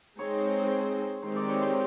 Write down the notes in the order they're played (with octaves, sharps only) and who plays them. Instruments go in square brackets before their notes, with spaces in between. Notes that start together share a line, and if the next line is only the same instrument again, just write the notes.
[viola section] G#3 C4 D#4 G#4 C5 [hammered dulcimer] C#5
[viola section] D#3 G#3 C4 D#4 G4 [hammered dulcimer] C5
[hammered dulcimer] D5
C#5
C5